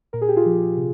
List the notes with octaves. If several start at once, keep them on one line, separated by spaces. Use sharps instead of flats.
A#2 A#4
G#4
G4
F4 G#4
F3
C3